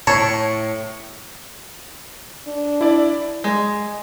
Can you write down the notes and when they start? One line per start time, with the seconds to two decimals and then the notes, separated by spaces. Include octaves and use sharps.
0.07 A2 C#5 A5
2.47 D4
2.81 E4 D5
3.44 G#3